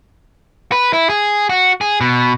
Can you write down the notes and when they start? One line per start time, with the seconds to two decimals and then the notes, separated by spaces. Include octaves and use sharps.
0.72 B4
0.93 E4
1.10 G#4
1.50 F#4
1.81 G#4
2.01 B2